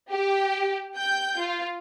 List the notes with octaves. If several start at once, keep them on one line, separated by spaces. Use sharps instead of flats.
G4
G5 G6
F4